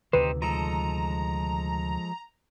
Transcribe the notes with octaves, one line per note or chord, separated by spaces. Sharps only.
D2 C3 D#3 D#4 G4 B4 C5
F3 G#3 A4 A#5